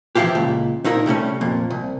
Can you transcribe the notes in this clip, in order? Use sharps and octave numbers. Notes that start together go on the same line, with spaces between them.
E3 F3 B3 E4 F4 G4
C#2 A#2
A#2 D#4 E4 A#4
C3 G3 A3 C#4
F2 A#2
C2